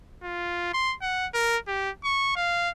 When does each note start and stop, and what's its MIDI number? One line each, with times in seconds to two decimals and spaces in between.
0.23 0.73 65
0.73 0.95 84
1.02 1.26 78
1.34 1.57 70
1.68 1.90 67
2.04 2.34 85
2.36 2.69 77